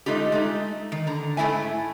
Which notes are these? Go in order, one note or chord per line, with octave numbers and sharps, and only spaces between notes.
G#3 A3 D#4 F4 G4
G#3 A3 D#4
D#3
D3 A#5
G#2 A3 B3 E4 E5 G#5